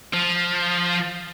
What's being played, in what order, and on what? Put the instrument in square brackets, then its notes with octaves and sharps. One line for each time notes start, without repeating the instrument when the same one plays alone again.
[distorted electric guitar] F3